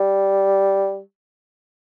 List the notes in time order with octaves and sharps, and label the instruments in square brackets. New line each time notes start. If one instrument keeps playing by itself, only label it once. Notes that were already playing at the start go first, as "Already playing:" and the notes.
Already playing: [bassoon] G3